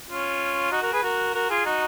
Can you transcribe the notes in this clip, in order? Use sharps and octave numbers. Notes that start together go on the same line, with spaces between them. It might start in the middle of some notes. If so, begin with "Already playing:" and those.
C#4 F4
D#4 F#4
F#4 A#4
G#4 B4
F#4 A#4
F#4 A#4
F4 G#4
D#4 F#4